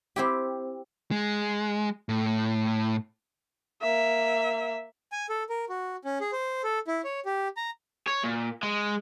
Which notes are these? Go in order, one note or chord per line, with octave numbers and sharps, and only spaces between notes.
C4 E4 G4
G#3
A2
A#3 E5
G#5
A4
A#4
F#4
C#4
G#4
C5
A4
E4
C#5
G4
A#5
C#5
A#2
G#3